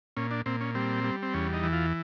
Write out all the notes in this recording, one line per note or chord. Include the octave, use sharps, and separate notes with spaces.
A#2 C#4
D4
A#2 C4
C#4
G3 C4
G3
C4
E2 C#4
D#4
E3
F4